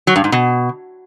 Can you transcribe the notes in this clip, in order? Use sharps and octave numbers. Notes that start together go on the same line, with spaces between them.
F#3
G2
G#2
B2